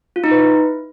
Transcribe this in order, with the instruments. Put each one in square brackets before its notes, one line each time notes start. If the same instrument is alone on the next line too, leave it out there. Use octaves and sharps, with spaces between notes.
[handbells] F4
D#4
B4
E4